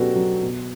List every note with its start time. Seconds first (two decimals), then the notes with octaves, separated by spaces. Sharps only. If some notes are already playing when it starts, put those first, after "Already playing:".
Already playing: B2 F#3 C#4 D4 F#4 G4 A4 B4
0.16 F#3
0.43 B2